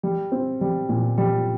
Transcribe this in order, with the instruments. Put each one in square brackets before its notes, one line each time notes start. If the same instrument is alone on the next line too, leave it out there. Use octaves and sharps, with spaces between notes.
[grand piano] G3
C4
G3
A#2
G3